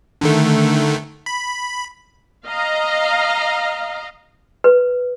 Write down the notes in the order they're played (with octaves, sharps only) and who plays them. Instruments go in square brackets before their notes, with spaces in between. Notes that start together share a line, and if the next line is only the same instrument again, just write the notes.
[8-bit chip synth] D3 D#3 A3
B5
[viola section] D#5 F5 A#5
[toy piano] B4